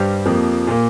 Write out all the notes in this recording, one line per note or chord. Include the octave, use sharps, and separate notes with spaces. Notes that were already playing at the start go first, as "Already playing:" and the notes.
Already playing: G2 G3 G4 C5
F2 F3 A#3
A#2 A#3